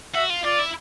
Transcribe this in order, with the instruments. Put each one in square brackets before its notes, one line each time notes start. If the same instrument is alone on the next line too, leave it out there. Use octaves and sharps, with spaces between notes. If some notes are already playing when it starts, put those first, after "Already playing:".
[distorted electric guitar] F#4 [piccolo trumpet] E5
[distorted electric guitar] F4
[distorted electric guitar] F4 [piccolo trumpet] D5
[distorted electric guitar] E4